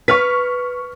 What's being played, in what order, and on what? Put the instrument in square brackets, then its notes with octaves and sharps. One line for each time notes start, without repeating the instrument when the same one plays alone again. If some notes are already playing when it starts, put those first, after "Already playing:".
[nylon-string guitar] B4 [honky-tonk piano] C#6 F6 B6